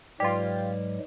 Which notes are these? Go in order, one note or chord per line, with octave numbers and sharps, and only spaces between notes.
G#2 F#3 G#3 F4 G4 B4 D5